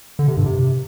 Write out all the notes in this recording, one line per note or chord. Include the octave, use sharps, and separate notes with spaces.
D3
C3
G2
C3